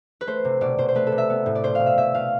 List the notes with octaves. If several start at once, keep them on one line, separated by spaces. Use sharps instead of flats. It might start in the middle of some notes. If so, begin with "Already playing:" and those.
B4
A3 C5
C3
B2 D5
B2 C5
C5
A3 B4
A4
C3
E5
B3
A2
D5
B2 C5
F5
B2
E5
B2 E5
B2 F5